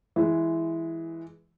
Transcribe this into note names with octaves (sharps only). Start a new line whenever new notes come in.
E3 G#3